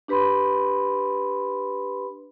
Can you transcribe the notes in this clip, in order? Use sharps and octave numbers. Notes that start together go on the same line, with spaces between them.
D4 G4 B4 B5 C6